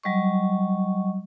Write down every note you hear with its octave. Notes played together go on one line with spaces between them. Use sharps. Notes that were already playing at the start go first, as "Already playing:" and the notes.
F#3 G3 D#5 C#6